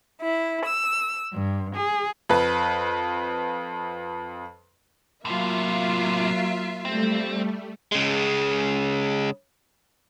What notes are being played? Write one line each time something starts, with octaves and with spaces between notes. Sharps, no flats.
E4
E6
G2
G#4
F2 B4
A2 C3 F#3 A#3 F4 E5
G3 A3 C4
C#3 G#3